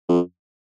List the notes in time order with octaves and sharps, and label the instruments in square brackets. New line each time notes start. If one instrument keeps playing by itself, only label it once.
[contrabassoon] F2